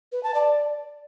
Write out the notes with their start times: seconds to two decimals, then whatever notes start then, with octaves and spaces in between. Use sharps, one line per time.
0.12 B4
0.23 A5
0.35 D5